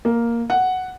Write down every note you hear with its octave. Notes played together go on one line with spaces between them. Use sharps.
A#3
F#5